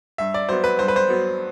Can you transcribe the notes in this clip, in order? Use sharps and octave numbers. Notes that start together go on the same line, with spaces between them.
G2 E5
D5
F#3 B3 C5
B4
G2 C5
B4
C5
F#3 B3